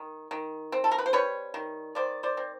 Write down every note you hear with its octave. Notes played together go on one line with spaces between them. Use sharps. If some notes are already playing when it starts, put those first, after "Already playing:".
Already playing: D#3
D#3
C4
A4
A#4
B4
C5
G3 B4 C#5
D#3
D#3 C5 D5
C5 D5
C4